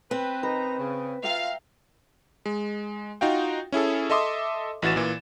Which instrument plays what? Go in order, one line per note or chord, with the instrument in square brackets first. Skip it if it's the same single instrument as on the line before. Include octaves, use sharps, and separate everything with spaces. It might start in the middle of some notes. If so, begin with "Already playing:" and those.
[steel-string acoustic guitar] C4 [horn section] B4
[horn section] D#3 D#4 A#5 [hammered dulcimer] B4
[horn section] C#3
[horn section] F4 [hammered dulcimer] E5 G5 A#5 [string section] F5
[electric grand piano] G#3
D#4 F4 F#4 F5 G5
C#4 E4 G#4 A4
A4 D#5 E5 C6 D6 D#6
A1 E3 F#4 A6 E7
A#2 E3